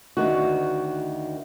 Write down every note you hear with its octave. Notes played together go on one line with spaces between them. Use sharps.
D2 D#3 F#4